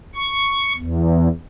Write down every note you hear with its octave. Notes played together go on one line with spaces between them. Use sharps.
C#6
E2